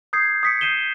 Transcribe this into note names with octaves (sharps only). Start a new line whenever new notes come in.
D#6 G6 G#6 C7
D#6 B6 C#7
G6 C7 D#7 E7 G7